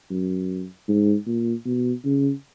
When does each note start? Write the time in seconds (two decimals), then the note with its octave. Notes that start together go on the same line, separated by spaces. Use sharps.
0.10 F#2
0.88 G#2
1.27 A#2
1.66 B2
2.05 C#3